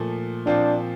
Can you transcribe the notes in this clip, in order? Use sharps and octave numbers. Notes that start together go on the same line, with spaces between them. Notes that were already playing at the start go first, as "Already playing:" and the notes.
Already playing: A#2 F3 A3
A#2 F3 C4 D4 F4